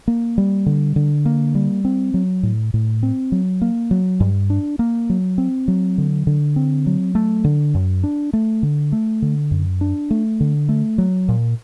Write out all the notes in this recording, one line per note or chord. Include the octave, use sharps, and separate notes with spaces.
A#3
G3
D3
D3
A#3
G3
C4
F#3
A2
A2
C4
F#3
A#3
F#3
G2
D4
A#3
F#3
C4
F#3
D3
D3
C4
F#3
A3
D3
F#2
D4
A3
D3
A3
D3
F#2
D4
A3
D3
A3
F#3
A#2